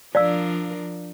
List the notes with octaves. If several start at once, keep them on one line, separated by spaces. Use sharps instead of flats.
F3 D4 A#4 D5 F5 E6